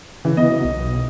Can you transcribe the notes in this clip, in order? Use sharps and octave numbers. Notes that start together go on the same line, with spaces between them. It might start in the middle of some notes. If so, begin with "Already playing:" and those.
C#3 E3
B3 D#5
F#3
B1